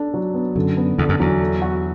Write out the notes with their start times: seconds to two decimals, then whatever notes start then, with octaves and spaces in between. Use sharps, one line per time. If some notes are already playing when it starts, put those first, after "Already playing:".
Already playing: D4 A4
0.14 F#3
0.34 B3
0.56 F#2 D3
0.77 B3
0.98 E2 D3
1.09 F#2
1.19 E2 F#3
1.40 A4
1.62 F#4